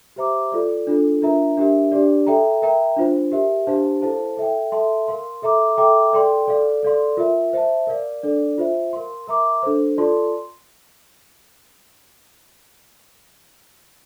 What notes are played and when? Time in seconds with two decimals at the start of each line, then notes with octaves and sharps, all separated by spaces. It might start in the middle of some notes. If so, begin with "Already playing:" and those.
0.16 G4 C5 E5 A#5 D6
0.52 F4 A4 D5
0.87 D4 F4 A4
1.22 D4 F4 A#4 E5 A#5
1.57 D4 G4 A#4 E5
1.92 D4 G4 D5
2.26 A4 E5 G5 A#5
2.62 A#4 E5 G5 A#5
2.97 D4 F4 C5
3.32 G4 A#4 E5
3.67 D4 G4 C5 F5 A5
4.02 E4 A4 C5 F5 A5
4.37 A4 E5 G5
4.72 A4 E5 A5 C6
5.08 A#4 F5 C6
5.42 A4 E5 A#5 D6
5.77 A4 E5 G5 A#5 D6
6.13 A4 D5 G5 C6
6.47 A4 D5 F5
6.83 A4 D5 F5 C6
7.17 F4 A#4 E5
7.53 C5 E5 A5
7.87 A#4 D5 F5
8.23 D4 A4 D5
8.58 F4 C5 E5
8.93 A#4 F5 C6
9.27 A#4 E5 A#5 D6
9.63 D4 A4 C5
9.98 F4 A4 D5 A5 C6